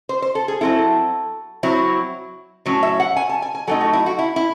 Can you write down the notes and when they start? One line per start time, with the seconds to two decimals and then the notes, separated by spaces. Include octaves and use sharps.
0.09 C5
0.22 C5
0.35 A4
0.48 G#4
0.61 F#3 C4 E4 A4
1.63 F#3 C4 E4
2.66 A2 F#3 C#4
2.83 E5
3.00 F#5
3.17 G#5
3.29 A5
3.42 G#5
3.55 G#5
3.67 F#3 A3 D#4 A4
3.81 F#4
3.93 E4
4.06 F#4
4.19 E4
4.36 E4